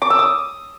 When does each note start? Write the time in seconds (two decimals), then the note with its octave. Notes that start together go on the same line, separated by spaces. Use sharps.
0.02 D6
0.10 E6
0.19 D#6